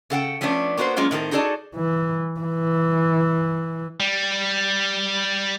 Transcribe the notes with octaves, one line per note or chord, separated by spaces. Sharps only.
C#3 A4 F#5 G5
F3 A3 B3 C#4 D4
A#3 B3 F#4 B4 C5
F#3 G#3 A#3 C#4 F4
A2 D#3 C4 A4
D#4 F#4 G#4 A4 D5 A5
E3
E3
G3